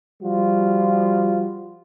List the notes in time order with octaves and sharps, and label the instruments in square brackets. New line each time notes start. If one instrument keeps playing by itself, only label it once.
[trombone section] F3 G3 F4 F#4